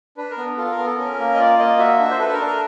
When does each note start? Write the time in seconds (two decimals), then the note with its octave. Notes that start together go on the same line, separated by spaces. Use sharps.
0.17 D4 B4
0.31 A#4
0.38 B3
0.57 F4 A4
0.71 A#4
0.78 B3
0.85 A4
0.98 C#4 A#4
1.19 A#3
1.34 D#5
1.39 F4 D5
1.59 A#3 D#5
1.79 F#4 E5
1.99 D4
2.11 C5
2.19 A4 B4
2.33 A#4
2.40 D4
2.47 A#4